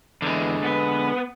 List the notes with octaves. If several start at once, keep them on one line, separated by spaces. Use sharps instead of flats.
E2 D3 G#3
B3 B4